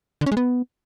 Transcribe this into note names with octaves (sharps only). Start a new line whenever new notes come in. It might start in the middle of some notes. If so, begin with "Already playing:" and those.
D3
C#4
G#3
B3